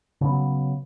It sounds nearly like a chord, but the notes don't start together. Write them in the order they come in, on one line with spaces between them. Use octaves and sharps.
C#3 B3 F#3